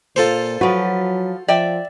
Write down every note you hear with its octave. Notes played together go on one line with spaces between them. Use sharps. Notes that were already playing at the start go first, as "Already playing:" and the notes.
A#2 F4 A4 C5
F3 F#3 F#4 B4
F3 D5 E5 G5